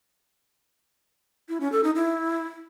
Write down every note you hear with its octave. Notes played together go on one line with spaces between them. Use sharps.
E4
C#4
A4
D#4
E4